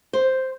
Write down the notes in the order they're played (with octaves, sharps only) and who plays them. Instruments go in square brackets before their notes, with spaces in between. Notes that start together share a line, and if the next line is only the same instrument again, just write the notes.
[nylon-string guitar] C5